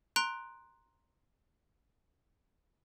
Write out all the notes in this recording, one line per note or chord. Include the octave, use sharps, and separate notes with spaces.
A#5 C6 F#6 D7